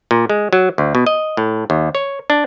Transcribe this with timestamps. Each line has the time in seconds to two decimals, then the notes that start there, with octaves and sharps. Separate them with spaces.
0.11 A#2
0.30 G#3
0.53 F#3
0.78 D2
0.95 B2
1.06 D#5
1.37 A2
1.70 D#2
1.95 C#5
2.30 D4